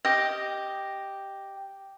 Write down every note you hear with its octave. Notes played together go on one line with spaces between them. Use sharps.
G4 D#5